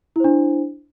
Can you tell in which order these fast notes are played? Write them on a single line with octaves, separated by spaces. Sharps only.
E4 C5 D4